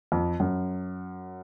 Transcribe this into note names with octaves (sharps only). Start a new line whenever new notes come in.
F2
F#2